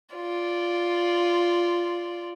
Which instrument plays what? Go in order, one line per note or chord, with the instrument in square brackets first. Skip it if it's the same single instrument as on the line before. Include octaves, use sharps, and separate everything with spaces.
[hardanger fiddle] F4 D5